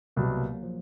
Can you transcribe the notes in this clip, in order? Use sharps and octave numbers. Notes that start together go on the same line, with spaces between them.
C2 B2 F#3 A#3
A#3
F#3
F3